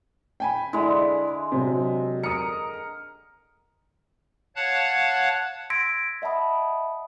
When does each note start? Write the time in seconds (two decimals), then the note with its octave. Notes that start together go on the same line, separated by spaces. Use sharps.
0.40 G5 G#5 B5
0.73 D3 G#3 E4 E5
1.52 C3 F#3
2.23 A#4 A#5 D#6 C#7
4.56 C#5 F5 F#5 A5 F#6 G#6
5.70 C6 E6 G#6 A#6 B6 D7
6.22 D#5 E5 F#5 A5 B5 D#6